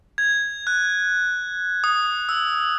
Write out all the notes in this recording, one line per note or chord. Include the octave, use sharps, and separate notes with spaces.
G#6
F#6
D#6
E6